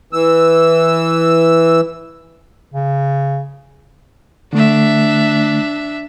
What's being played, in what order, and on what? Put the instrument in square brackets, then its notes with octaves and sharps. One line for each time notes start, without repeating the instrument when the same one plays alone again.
[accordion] E3 E6
[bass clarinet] C#3
[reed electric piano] D3 A3 [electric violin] D4 E5